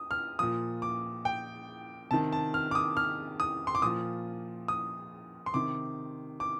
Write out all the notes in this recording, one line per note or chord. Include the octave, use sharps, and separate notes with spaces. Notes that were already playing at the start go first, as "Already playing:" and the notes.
Already playing: D#6
F6
A#2 F3 D#6
D6
G5
C3 D#3 A5
A5
F6
D6
D#6
F6
D#6
C6
D6
A#2 F3 D#6
D#6
C6
C3 D#3 D6
D6